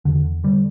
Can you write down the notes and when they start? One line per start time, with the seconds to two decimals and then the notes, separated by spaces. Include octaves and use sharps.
0.05 E2 D3
0.44 D3 G3